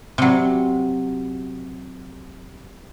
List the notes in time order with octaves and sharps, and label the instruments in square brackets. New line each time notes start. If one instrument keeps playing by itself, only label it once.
[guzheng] C3 F#3